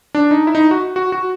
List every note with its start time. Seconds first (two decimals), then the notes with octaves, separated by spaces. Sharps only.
0.15 D4
0.31 D#4
0.47 E4
0.55 D#4
0.71 F#4
0.96 F#4
1.12 F#4